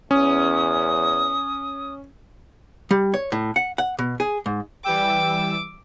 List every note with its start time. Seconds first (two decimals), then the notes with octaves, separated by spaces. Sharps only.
0.11 E2 C#4 D#6
2.91 G3
3.14 C#5
3.32 A2
3.56 F#5
3.78 F#5
3.99 B2
4.20 G#4
4.46 G#2
4.84 E3 G3 G5 D6 E6